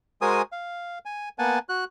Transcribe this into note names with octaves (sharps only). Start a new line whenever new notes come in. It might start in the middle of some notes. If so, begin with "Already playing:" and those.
G#3 F#4 A#4 C5 G#5 D#6
F5
G#5
A#3 B3 F#5 G#5 A5
F#4 F#6